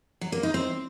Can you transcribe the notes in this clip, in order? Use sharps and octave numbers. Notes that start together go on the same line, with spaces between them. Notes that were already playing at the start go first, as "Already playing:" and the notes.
F#3
A#3
D#4
C4